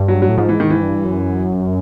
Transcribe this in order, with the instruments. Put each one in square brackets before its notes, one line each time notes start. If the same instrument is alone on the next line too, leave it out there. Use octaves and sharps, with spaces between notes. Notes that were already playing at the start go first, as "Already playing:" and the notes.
Already playing: [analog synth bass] G2
[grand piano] F#3
F#3
[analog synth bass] A2
[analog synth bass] G#2 [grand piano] F3
[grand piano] E3
D#3
E3
[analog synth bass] G2
F#2